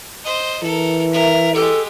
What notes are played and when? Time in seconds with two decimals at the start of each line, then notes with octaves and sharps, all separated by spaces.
0.25 C5 D#5
0.63 E3 A4 A#4
1.13 A#4 E5
1.55 G#3 G4 A4